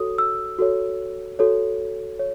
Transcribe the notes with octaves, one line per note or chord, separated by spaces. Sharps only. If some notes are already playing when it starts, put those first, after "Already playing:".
Already playing: F#4 A4 C#5 D#6
E6
F#4 A4 C#5
F#4 A4 C#5
C#5